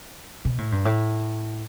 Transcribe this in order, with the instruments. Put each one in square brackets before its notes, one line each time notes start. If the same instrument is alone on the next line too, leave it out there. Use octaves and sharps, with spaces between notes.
[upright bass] B2
A2
G2
A2